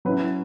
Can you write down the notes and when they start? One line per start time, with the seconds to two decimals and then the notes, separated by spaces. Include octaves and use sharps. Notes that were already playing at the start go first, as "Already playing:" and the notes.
0.05 F#3 C#4 E4 B4